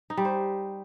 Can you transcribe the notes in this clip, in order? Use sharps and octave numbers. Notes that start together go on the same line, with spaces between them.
D#4
G3
C5